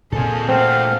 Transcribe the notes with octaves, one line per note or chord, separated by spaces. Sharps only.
A#2 C4 G#4 A4
A3 C4 F#4 F5